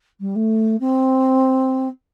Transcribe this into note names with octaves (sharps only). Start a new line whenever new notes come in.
G3
A3
C4